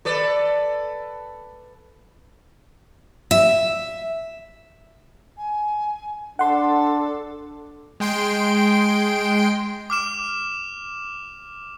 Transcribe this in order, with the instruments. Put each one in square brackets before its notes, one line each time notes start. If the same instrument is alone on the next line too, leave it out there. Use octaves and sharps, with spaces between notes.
[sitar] A4 B4 D5
[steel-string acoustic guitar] E5
[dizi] G#5
[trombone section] D4 [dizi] A4 [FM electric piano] F#5 C6
[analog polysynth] G#3 G5 C6 D7
[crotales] D6 F6 E7